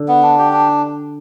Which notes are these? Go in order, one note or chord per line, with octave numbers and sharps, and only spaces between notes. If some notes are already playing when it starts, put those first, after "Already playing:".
Already playing: D3
B3
D4
G4
D4